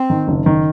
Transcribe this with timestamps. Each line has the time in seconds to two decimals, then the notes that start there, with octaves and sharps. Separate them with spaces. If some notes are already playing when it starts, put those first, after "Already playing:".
Already playing: C4
0.10 D#3
0.28 F#1
0.46 D#3